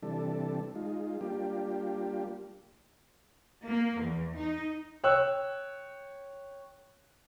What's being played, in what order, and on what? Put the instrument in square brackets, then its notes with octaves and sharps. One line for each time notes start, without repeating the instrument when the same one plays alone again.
[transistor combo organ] C3 E3 G3 D4 A4
G#3 D#4 F4
G3 A#3 D4 F4 G4
[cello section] A#3
E2
D#4
[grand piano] C#5 G5 E6 F#6